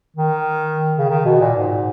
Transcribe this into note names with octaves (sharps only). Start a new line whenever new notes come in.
D#3
C#3
D#3
B2
A#2
G#2